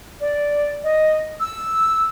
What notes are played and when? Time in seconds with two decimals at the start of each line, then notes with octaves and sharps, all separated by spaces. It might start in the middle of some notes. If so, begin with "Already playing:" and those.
0.21 D5
0.83 D#5
1.41 E6